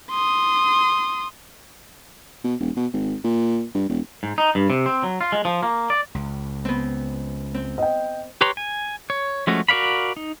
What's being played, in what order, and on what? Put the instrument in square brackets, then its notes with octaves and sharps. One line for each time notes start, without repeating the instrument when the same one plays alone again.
[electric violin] C6 D#6
[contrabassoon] B2
E1
B2
G#1
A#2
G2
E1
[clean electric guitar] G#2
D#4
G2
C3
C4
F#3
F4
G#3
F3
A#3
D5
[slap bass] C#2
[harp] B3 C4
C4
[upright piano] D#5 G5
[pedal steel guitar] G4 B4 C#5 A#5 C6
G#5
C#5
F3 G#3 A3 C#4 F#4
F#4 A#4 D5 F5 B5
D#4